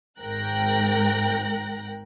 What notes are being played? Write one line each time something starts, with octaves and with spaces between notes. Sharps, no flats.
G#1 G#2 A#4 G5 F#6 A#6